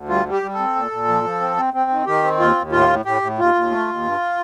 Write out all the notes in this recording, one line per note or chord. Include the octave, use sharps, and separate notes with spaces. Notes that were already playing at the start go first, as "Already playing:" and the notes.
Already playing: D2
G3 F4
G3
G4
G3
A4
C4
A#2
A#2
F3
F3
C4
C4
C4
D#3
D#3 G4
C4
D#2 F4
D#2
A2 F4
A2
A2 G4
A2
D#2 F4
D#2
A3
D#2
G2